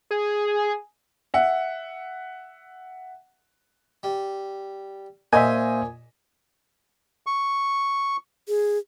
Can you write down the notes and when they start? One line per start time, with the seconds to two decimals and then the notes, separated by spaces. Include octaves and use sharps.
0.11 G#4
1.34 E5 F#5
4.03 G3
5.33 A#2 A#3 C5 D#5 E5 G#5
7.27 C#6
8.48 G#4